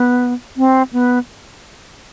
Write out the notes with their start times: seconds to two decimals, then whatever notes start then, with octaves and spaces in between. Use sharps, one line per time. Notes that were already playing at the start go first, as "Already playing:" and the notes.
Already playing: B3
0.57 C4
0.93 B3